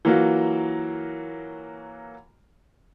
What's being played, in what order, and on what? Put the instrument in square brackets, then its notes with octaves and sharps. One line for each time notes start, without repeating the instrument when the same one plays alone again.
[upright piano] E3 F#3 A#3 F4 F#4